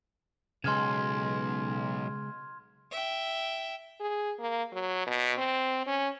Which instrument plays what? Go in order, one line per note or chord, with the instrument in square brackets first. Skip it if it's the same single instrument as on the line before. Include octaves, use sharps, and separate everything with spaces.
[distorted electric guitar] B1 [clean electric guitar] C#3 G#3 [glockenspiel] C6 F6 G#6
[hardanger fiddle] E5 G5
[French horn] G#4
A#3
F#3
B2
C4
C#4